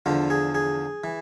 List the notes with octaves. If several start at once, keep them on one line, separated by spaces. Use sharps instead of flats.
E2 D3 F3 F4
G#4
G#4
E3